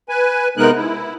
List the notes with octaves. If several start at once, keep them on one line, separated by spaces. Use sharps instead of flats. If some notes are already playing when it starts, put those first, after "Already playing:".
B4 G#5
C3 G#3 B3 D#4 A#4 F#6
E4